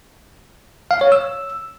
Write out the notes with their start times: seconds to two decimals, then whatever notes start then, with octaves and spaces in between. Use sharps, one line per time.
0.91 F5
1.01 C#5
1.12 E6